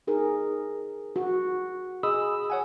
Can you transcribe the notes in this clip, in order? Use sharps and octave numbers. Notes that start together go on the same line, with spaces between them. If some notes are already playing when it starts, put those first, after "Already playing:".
D#4 G#4 A#4
F#4
G#4 D#5 B5 D#6 E6
C#5 F#5 G#5